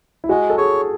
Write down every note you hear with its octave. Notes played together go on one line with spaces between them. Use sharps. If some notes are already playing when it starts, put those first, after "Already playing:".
E4
G#3 F#4
A4
G#4 C#5